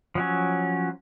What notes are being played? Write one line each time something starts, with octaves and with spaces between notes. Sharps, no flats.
F3 F#3 C#4